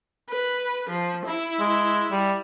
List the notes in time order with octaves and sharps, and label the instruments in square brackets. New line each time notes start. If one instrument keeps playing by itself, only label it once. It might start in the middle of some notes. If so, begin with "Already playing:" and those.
[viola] B4
F3
E4
[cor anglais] G#3
G3